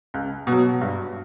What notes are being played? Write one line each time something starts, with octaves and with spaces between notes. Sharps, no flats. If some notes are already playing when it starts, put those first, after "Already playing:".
C#2
B2
F#3
G2